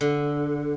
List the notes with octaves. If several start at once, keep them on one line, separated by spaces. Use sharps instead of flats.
D3